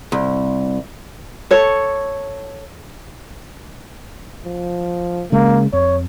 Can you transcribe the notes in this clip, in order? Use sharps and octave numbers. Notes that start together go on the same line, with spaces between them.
C2
A4 C#5
F3
C#3 G#3 A#3
F2 C#5